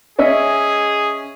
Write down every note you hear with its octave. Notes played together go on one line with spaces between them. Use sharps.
C#4 G#4 D#5 E5